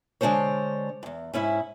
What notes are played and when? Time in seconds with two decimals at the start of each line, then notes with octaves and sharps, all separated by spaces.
0.21 D3 G#3 B3 D4 C5 C#5
1.03 E2 G#2
1.34 G#2 C#4 E4